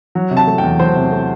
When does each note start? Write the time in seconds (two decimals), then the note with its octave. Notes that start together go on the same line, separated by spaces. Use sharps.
0.15 F#3
0.31 C3
0.37 A5
0.47 A3
0.58 G5
0.63 E2
0.79 F#3 C5
0.96 C3
1.12 A3